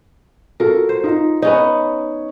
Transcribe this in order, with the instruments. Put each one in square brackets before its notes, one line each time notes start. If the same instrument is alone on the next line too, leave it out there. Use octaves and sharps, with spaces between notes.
[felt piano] F4 F#4 A4 [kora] A#4
[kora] C5
[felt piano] D#4 F4
[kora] B3 C#4 D#4 [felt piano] C#5